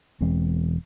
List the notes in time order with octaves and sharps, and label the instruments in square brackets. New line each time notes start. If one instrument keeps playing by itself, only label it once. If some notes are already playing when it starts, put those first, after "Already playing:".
[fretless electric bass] E1 E2 G#3 C4